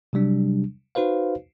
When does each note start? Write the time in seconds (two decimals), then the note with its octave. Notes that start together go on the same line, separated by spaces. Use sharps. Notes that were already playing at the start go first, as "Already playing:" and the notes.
0.13 C3 F#3 G3 D4
0.95 D#4 F#4 B4 C5 F5